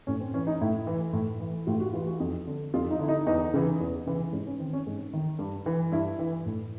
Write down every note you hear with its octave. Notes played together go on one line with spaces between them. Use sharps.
A2 C#4
C4
E3 C#4
D#4
A2 E4
E3
A2
E3
A2 F4
F#4
E3 F4
F#4
F2
D3
F2 F4
D#4
D3 E4
D#4
E2 D#4
C#3 E3
E2
C#3 E3
G#2 C#4
C#4
D#3 C4
C#4
G#2
D#3
G2
E3
G2 E4
E3
A2